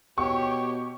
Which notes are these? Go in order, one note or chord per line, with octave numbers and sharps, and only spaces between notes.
B2 G4 C#5 C#6